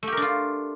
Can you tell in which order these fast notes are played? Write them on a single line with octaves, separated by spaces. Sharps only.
A3 G4 A#4 D4 F4